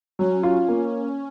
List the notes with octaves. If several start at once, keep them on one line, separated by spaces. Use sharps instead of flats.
F#3 C#4
F4
A#3